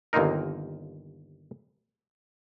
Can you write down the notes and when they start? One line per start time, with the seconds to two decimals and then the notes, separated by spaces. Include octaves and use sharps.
0.13 G1 D#2 A#3 C4 D#4 A#4